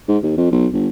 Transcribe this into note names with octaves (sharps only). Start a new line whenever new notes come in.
G#2
D#2
F2
B1
G1